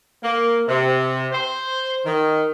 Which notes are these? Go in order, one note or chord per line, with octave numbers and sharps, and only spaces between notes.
A#3
C3
C5
D#3